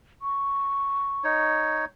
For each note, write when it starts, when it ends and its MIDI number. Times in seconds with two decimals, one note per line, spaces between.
0.22 1.44 85
1.24 1.85 63
1.24 1.85 73